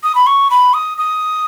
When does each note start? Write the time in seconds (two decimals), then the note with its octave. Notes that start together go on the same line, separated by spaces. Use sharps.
0.03 D#6
0.15 B5
0.27 C#6
0.50 B5
0.74 D#6
0.98 D#6